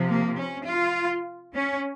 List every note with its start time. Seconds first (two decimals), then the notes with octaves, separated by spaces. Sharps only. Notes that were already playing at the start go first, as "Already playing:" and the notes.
Already playing: C3 F3
0.09 A#3
0.38 C#4
0.67 F4
1.54 C#4